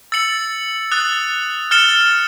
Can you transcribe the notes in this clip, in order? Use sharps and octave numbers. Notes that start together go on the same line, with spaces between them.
E6 A6 C#7 F#7
D#6 F#6 A6
F6 A6 C#7 E7 G7